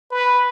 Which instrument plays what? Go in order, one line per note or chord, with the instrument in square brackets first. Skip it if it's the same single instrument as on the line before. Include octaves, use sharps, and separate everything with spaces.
[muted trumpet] B4